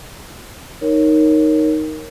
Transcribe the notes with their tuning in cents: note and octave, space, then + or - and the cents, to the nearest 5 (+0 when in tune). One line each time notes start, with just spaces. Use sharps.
D#4 +0 A#4 +0 C#5 +0